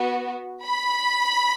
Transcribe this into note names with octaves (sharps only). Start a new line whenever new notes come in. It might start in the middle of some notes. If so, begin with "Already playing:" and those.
Already playing: B3 F#4
B5